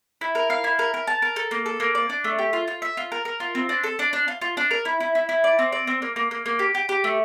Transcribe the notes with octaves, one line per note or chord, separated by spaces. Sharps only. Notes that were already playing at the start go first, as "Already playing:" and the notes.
E4
A#4
F5
E4
A#4
A#4
A5
A#4
A4
A#3
A4
A#3
D5
D4
A3
G4
F4
F4
E5
F4
A#4
A#4
F4
C4
D4
A4
D4
D4
F4
F4
D4
A#4
E4
E4
E4
E4
D5
C4
D5
C4
A#3
A#3
A#3
A#3
G4
G4
G4
A3